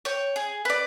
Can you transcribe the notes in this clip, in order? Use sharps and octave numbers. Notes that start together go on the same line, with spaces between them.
C#5 G5
G#4
B4 D5